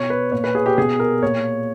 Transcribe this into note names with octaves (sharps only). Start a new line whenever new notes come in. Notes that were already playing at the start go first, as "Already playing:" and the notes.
Already playing: B2 C#5
B4
A#2 C#5
B4
G#4
G4
B2 G#4
A#4
A#2 C#5